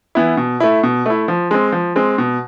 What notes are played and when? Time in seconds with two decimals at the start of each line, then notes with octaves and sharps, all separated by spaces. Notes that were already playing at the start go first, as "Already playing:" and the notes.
0.15 E3 B3 E4
0.37 B2
0.60 A3 E4
0.83 B2
1.06 A3 E4
1.28 F3
1.51 G#3 C4
1.72 F3
1.96 G#3 C4
2.18 B2